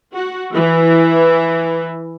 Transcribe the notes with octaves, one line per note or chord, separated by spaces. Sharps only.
F#4
E3